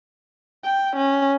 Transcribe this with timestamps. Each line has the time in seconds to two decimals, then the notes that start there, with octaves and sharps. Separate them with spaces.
0.65 G5
0.96 C#4